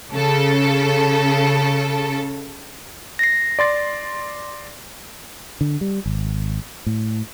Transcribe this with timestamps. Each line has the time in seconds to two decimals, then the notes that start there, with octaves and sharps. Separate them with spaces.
0.14 C#3 A4
3.19 A#6 C7
3.59 D5 C6 A6
5.61 D3
5.81 G3
6.06 G#1
6.86 A2